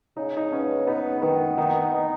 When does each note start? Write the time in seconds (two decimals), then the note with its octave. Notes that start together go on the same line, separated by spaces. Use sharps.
0.17 C#3 D#4
0.37 D#4
0.52 B3 C#4
0.87 B3 D#4
1.22 D#3 B3
1.57 D#3 D#4
1.93 D#4